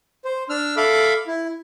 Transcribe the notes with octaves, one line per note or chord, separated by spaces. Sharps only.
C5
D4 E6 F6
A4 E5 F5 B5 D6
E4